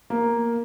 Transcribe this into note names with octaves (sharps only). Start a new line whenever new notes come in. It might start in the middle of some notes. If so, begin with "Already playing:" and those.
A#3